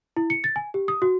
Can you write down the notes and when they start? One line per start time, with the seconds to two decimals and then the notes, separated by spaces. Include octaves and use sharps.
0.17 E4
0.30 C#7
0.44 A6
0.56 G#5
0.74 G4
0.88 D#6
1.02 F#4